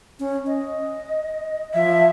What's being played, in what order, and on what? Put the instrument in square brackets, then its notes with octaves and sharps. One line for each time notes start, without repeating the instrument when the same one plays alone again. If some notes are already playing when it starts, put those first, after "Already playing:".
[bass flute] C#4
D#5
[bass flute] F3 [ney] E5